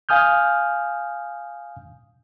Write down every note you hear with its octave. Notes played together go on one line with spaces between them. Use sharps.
F5 G#5 D#6 F6 G6